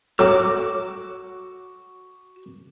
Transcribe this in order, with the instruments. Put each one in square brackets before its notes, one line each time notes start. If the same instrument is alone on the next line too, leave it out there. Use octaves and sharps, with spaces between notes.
[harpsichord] F#3 A3 [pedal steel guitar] F#4 D6 E6